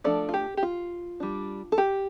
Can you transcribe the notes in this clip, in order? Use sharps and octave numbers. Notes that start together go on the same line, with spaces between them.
F3 A3 D4 A4 D5
F4
G4
G4
F4
G3 D4
A4
G4